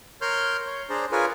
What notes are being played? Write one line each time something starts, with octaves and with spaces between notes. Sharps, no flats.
A#4 C#5 C6 F6 G6
C#5
D4 G#4 C5 D5 A#5
F4 G#4 A#4 B4 C#5 G#5